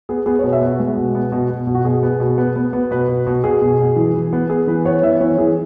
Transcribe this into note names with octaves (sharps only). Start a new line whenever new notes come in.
B3 G#4
B3 G#4
C#5
B2
E5
B3 F#4
G#3
B2
B3
B2
B2
B2
F#4
B2 G#4
B3
B2
B3
B3
B3
B2 B4
B2
B2
B2 G#4
B2
B2
E3
E3
B3
B3 G#4
E3 B4
B3 C#5
E3 E5
E3 C#5
E3 G#4